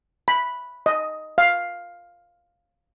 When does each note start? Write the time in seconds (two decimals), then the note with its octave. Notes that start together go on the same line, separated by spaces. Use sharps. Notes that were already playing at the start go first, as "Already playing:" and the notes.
0.28 B5
0.86 D#5
1.38 F5